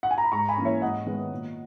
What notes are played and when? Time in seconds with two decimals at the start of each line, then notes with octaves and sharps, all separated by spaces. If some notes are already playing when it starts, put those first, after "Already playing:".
0.03 F#5
0.11 G#5
0.18 A#5
0.25 B5
0.32 G#2 A#5 C#6
0.49 G#5 B5
0.57 E3 A#3 C#4
0.65 C#5 E5
0.82 G#2 D#5 F#5
1.06 D#3 G#3 B3
1.32 A#2